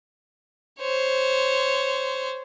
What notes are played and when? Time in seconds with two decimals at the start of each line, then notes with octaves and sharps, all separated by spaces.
0.80 C5 C#5